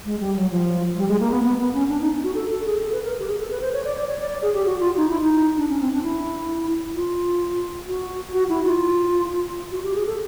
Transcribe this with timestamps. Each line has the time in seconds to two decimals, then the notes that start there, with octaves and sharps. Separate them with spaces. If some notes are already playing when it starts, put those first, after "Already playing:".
0.05 G#3
0.20 G3
0.36 F#3
0.50 F3
0.97 G3
1.08 G#3
1.20 A#3
1.31 B3
1.43 B3
1.58 B3
1.73 C#4
1.89 D4
2.01 D#4
2.24 F#4
2.35 A4
2.50 A4
2.66 G#4
2.81 A4
2.92 B4
3.04 A#4
3.19 G4
3.27 G#4
3.39 A4
3.50 B4
3.62 C5
3.73 C#5
3.85 D5
3.96 D5
4.08 C#5
4.19 D5
4.30 D5
4.42 G#4
4.54 G4
4.65 F#4
4.80 F4
4.97 D#4
5.09 E4
5.21 D#4
5.57 D4
5.69 C#4
5.81 C4
5.92 D4
6.03 E4
6.95 F4
7.88 F#4
8.33 F#4
8.49 E4
8.64 F4
9.72 F#4
9.83 G4
9.95 G#4
10.06 A4